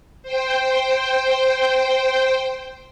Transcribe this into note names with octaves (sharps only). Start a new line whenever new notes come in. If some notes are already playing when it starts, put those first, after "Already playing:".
C5 G5